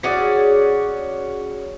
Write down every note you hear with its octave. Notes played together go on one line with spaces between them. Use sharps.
C#4 F#4 G#4 D5